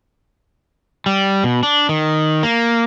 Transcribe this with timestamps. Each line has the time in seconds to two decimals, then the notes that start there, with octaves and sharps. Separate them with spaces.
1.06 G3
1.44 B2
1.63 D4
1.89 D#3
2.43 A#3